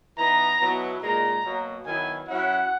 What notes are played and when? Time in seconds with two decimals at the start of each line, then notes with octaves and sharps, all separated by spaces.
0.18 E3 B3 D#4 A#5
0.61 B2 F#3 B3 E4
1.02 A#2 G#3 D#4 A#5
1.44 B2 F#3 A#3
1.86 D#3 F#3 B3 E4 G#5
2.27 F#3 C#4 E4 F#5